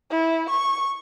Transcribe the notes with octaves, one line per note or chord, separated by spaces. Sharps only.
E4
C#6